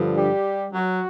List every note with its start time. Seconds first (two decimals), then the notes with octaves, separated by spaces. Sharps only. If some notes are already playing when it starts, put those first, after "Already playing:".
Already playing: G2 D3 F3
0.17 G3 G4
0.73 F#3 F#4